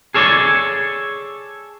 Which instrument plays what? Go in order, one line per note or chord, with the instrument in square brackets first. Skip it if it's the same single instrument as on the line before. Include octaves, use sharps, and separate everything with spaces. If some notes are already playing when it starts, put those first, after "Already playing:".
[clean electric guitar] G#4 A4 C#5 D5